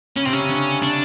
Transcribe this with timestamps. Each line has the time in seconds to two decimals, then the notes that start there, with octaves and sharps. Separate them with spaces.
0.16 C#3 C#4
0.25 C3 C4
0.33 C#4
0.38 C#3
0.49 D3
0.82 D4